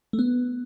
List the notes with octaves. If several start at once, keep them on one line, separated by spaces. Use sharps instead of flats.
A3
B3